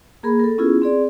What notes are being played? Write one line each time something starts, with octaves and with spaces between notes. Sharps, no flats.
A#3 G#4 A#4 B5
A4 A#4
B3 C#4 E4 F4 G#4
C4 G#4 D5